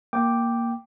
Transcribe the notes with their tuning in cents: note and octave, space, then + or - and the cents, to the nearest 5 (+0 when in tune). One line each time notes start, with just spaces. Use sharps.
A#3 +0 G5 +0 D6 +0